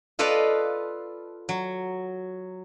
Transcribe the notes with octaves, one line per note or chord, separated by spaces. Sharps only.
F4 A4 B4 D5 D#5 F5
F#3